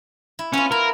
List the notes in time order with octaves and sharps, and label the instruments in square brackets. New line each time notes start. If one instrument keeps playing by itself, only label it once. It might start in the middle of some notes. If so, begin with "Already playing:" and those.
[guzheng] E4
[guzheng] B3 F4 [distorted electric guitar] C#4
[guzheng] E4 [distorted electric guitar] A#4